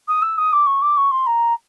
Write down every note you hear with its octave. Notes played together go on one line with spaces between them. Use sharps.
D#6
E6
D#6
D6
C#6
D6
C#6
C6
A#5